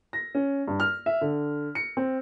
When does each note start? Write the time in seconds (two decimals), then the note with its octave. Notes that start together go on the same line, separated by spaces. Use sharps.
0.13 A#6
0.35 C#4
0.68 G2
0.80 F6
1.06 E5
1.21 D3
1.75 C#7
1.97 C4